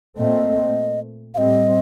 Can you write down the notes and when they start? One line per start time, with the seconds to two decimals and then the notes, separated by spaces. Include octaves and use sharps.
0.17 A#2 A3 C4 D#5
1.34 A2 G3 C4 D#5 F5